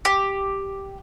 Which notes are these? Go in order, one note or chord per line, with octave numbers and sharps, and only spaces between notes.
G4